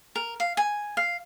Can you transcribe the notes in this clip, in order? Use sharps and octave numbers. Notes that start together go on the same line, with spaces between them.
A#4
F5
G#5
F5